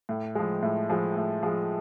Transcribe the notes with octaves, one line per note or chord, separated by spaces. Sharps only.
A2
F3 G#3
A2
F3 G#3
A2
F3 G#3